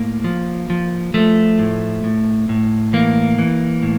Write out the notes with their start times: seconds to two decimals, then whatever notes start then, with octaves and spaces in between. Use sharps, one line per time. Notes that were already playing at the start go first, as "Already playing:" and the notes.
Already playing: A2 A#3
0.24 F3
0.70 F3
1.14 F3 A3
1.59 A2
2.04 A2
2.49 A2
2.93 E3 A#3
3.38 E3
3.83 A2